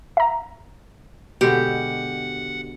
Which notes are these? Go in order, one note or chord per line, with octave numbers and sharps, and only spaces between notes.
E5 A#5
B2 D3 G#3 G4 F#5